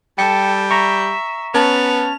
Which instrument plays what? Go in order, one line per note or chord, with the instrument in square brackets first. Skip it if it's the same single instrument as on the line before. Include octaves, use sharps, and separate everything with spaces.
[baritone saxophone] G3 [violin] A4 [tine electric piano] G5 C#7
[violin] E5 [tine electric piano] A#5 C#6
[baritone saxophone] B3 [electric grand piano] C#4 A5 [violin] F7